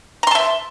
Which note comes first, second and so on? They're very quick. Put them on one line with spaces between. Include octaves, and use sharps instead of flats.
A#5 C6 A5 E5